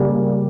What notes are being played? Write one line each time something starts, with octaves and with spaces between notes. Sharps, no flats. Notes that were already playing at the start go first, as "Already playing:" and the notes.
Already playing: C#3 G3 A#3